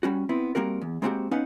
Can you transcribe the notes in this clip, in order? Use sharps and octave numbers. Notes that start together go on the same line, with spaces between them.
G3 C#4 F#4
B3 C4 E4
G3 A#3 C4 F#4 A#4
E2
G#3 A#3 C4 D#4 F#4 G4
B3 C#4 D#4 B4 F5 F#5